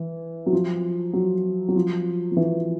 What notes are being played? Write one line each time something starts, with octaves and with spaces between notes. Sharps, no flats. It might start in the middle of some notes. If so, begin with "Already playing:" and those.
Already playing: E3
F#3
F3
F#3
F#3
F3
F3
E3